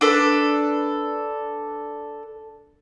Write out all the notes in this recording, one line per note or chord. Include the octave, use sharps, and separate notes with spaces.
D4 A4 B4